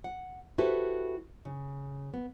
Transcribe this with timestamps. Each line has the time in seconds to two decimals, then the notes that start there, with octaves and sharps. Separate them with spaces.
0.04 F#5
0.58 E4 F#4 G4 A4 B4 C5
1.45 C#3
2.14 B3